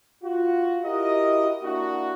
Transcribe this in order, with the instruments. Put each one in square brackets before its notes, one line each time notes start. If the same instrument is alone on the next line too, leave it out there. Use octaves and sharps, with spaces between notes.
[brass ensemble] F4 F#4
E4 F#4 G4 A#4 D#5
A#3 D4 E4 F#4